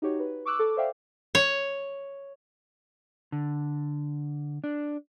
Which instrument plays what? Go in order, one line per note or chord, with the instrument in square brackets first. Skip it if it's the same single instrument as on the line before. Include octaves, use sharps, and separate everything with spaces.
[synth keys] D#4 F#4 G4 C#5
B4
C#6 D6 E6 F#6
A4 D6
C5 D5 E5 F5 G5
[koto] C#5
[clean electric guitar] D3
D4